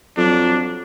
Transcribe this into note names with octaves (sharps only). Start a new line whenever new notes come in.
F2 F#3 D4